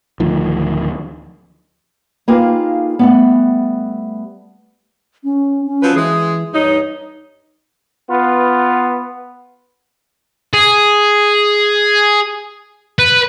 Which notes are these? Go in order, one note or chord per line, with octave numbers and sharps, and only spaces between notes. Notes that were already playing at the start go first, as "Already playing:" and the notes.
D1 D2 D#3 F3
A#3 D#4 F4 G4 G#4 B4
G3 A3 B3
C#4
C#4
F3 F#3 B4
E3 G#3 G#4
G2 D#4 C#5
B3 F4 B4
G#4
B4